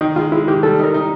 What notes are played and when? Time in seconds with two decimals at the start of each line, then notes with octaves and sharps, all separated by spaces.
0.01 D#3 D#4
0.16 G#3 F4
0.32 G#3 E4
0.48 D#3 G4
0.63 G3 A4
0.79 D#4
0.84 A#4
0.94 D#4